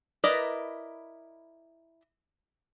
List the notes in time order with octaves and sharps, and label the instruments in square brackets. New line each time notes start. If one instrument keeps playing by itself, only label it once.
[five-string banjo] E4 A#4 B4 D5 D#5